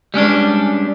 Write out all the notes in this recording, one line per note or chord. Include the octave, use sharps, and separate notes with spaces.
G3 G#3 C#4 D4